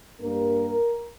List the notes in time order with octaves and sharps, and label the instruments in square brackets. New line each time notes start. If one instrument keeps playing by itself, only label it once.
[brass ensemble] G2 G3 A#3 A#4